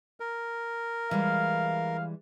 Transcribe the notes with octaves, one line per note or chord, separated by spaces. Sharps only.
A#4
E3 G3 G#3 F5